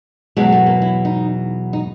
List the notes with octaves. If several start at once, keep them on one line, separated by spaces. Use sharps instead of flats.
E2 B2 F#3 G#3
A3
A#3
E4
D#4
D#4